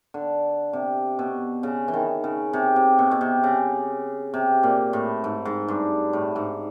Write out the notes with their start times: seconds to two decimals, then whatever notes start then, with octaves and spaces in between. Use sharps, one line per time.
0.14 D3
0.73 C3
1.19 B2
1.63 C#3
1.88 E3
1.94 D#3
2.24 C#3
2.53 C3
2.76 C3
2.99 B2
3.11 B2
3.21 C3
3.44 C#3
4.34 C3
4.63 A#2
4.93 A2
5.24 G#2
5.45 G#2
5.68 G2
6.13 A2
6.36 G#2